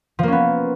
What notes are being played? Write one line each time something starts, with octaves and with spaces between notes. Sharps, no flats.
F3 A#3 B3 C#4